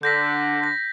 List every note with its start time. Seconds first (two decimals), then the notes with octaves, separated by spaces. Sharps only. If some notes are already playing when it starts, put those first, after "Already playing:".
0.03 D3 G6 A#6 B6
0.64 A#6